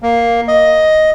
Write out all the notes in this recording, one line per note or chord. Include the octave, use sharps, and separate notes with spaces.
A#3
D#5